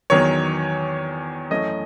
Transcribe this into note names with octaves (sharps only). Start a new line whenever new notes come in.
E2 D#3 F#3 C#5
F#2 E3 A3 C#4 D#5